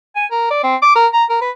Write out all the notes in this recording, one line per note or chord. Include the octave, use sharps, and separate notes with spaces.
G#5
A#4
D5
C4
D6
A#4
A#5
A#4
B4